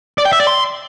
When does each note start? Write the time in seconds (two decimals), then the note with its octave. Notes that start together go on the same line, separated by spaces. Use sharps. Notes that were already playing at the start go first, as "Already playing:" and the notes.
0.18 D5
0.25 G5
0.33 E5
0.40 D5
0.47 C6